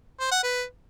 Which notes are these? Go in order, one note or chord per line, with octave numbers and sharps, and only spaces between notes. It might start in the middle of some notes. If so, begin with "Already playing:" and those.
C5
F#5
B4